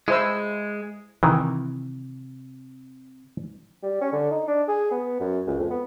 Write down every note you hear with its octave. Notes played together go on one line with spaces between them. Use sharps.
G#3 E4 C5 E6
C3 D#3 E3
G3
C#4
D3
D#4
D4
G#4
B3
F#2
C#2
F2
B3